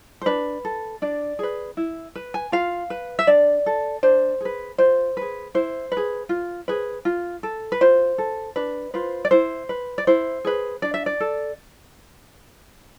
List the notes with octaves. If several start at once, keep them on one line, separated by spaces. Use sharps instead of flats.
C5
D4 B4
A4
D4 D5
G#4 B4
E4
B4
G#5
F4 F5
B4
E5
D4 D5
A4
D4 C5
G#4 B4
F4 C5
G#4 B4
E4 C5
B4
G#4
F4
G#4 B4
F4
A4
B4
F4 C5
A4
D4 B4
F4 B4 C5
D5
E4 C5
B4
D5
E4 C5
G#4 B4
D4 D5
E5
D5
A4